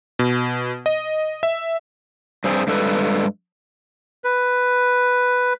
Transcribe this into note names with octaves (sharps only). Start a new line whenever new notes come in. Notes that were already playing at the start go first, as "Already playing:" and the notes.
B2
D#5
E5
G2 C4 G#4
G2 G#3 A4 B4
B4